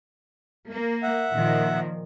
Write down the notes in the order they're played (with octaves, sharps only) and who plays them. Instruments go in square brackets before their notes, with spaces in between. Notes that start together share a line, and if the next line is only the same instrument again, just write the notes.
[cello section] A#3
[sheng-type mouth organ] E5 F#5
[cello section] A#2 D#3 F3